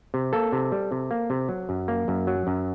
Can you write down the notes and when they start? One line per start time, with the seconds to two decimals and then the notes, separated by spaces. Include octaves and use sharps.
0.14 C3
0.33 A#3 A4
0.52 C3
0.72 G3
0.92 C3
1.11 A#3
1.30 C3
1.49 F#3
1.69 F#2
1.88 A#3
2.08 F#2
2.27 F#3
2.47 F#2